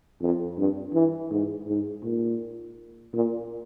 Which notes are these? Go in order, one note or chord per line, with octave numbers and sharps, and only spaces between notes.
F2
G2
E3
G#2
G#2
A#2
A#2